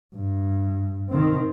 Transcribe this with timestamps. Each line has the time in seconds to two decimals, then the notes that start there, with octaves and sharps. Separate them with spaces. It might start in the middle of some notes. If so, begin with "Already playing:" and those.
0.15 G2
1.09 D#3 C4